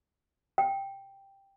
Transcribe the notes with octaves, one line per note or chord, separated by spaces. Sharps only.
G5